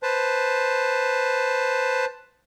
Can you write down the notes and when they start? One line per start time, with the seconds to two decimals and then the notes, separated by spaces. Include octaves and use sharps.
0.03 B4 C5 A5